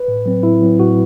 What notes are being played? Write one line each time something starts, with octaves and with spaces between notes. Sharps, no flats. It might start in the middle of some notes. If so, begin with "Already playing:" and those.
Already playing: B4
A2
F#3 C4
A2 E4
F#3 C4
A2 F#4